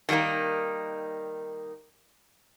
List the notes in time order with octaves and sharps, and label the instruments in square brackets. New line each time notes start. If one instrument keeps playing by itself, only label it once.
[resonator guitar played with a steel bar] D#3 G3 A3 A#3 D#4